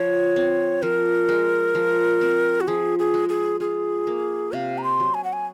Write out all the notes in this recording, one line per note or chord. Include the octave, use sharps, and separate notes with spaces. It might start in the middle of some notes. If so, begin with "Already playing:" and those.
Already playing: F3 C#5
C4
F3 A#4
G#3
F3
C4
F#4
F3 G#4
G#4
G#3
G#4
F4 G#4
A#3
C3 F5
A#5
C6
F#3
G#5
F#5
G#5